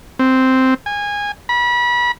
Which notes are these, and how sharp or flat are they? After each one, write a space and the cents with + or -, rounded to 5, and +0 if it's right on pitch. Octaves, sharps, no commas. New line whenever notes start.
C4 -5
G#5 -20
B5 -30